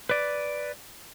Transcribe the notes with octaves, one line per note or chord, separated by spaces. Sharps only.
B4 D5